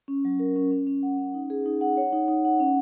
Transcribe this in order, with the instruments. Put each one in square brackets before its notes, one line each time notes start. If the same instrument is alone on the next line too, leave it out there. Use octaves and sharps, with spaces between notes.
[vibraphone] C#4
F#3
A#4
C#4
C#4
C#4
F#5
C#4
D#4
G#4
D#4
F#5
C#5
D#4
D#4
F#5
C#4